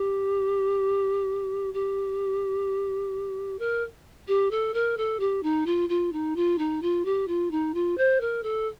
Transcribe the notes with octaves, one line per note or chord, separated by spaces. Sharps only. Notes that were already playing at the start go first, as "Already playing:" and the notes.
Already playing: G4
G4
A#4
G4
A4
A#4
A4
G4
D#4
F4
F4
D#4
F4
D#4
F4
G4
F4
D#4
F4
C5
A#4
A4